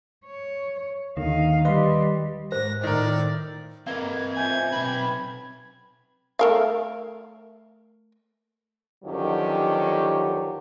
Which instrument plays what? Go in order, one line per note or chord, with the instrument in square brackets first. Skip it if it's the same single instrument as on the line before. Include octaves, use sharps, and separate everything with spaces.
[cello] C#5
[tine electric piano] D#2 D3 [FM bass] D#3 [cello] D#4 F5
[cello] G3 G4 [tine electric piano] B4 D#5 C6
[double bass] G#2 [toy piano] C5 [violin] A#6
[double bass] A2 [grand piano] D#3 A#4 [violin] D5
[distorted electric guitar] C4 D#5 [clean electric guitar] A#4 B4 F5 [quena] G#6
[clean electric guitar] C5 E5 G#5 [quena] G6 [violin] G#6
[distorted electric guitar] B1 B4 [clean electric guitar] C4 [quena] B5
[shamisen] A3 A#4 F5
[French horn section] F#2 D3 D#3 F3 F#3 G4